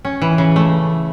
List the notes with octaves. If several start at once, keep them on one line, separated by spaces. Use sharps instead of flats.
C#4
E3
C#3
A3